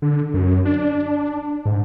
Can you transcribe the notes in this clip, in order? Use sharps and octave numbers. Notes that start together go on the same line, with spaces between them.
D3
F#2
D4
G#2